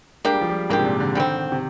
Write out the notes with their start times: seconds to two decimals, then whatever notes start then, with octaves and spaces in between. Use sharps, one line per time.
0.24 G#3 A#3 D4 G4
0.33 G3
0.41 F3
0.50 G3
0.70 G#2 A#3 D4 G4
0.79 C3
0.85 A#2
1.00 D3
1.15 D3 D#3 G3 C4
1.52 C3